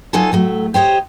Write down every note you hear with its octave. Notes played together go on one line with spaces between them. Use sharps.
F#3 D#4 F4 A4 G#5 A5
A2 F#3 A3
G4 C5 C#5 D#5